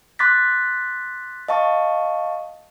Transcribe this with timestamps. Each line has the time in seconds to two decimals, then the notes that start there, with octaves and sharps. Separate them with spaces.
0.19 C6 D6 F#6 A6 B6
1.48 D#5 F5 A5 C#6